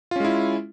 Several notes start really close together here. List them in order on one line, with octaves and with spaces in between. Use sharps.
F4 C#4 G#3 E4